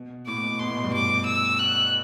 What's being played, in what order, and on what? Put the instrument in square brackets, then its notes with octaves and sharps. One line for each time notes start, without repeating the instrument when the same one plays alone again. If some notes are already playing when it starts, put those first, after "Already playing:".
Already playing: [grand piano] B2
[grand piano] A2 [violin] D6
[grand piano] B2
[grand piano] B2 [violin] C6
[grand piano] A2
B2
G2
[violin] D6
E6
F#6